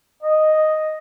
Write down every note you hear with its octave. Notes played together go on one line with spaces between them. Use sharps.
D#5